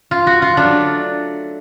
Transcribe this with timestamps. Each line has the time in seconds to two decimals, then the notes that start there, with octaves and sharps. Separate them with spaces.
0.11 F4
0.27 F#4
0.42 F4
0.57 F#3 A3 D4